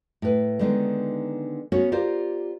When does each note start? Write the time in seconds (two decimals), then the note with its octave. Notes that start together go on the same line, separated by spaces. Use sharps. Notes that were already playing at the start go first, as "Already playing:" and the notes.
0.22 A2 B4
0.59 D3 D#3 G3 G#3 B3 D#4
1.72 B3 C#4 F#4 A#4 C#5
1.92 F4 G4 A#4 C5 D5